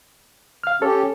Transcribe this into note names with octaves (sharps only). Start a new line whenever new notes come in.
F5 F6
C#4 G4 A4 C#5